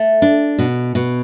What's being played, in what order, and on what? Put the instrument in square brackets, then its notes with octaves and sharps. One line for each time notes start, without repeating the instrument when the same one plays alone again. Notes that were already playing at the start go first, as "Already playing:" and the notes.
Already playing: [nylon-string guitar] A3
D4
B2
B2